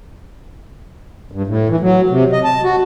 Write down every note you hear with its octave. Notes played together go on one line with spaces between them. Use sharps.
G2
A2
E3
F#3
C3
D#5
A5
F#4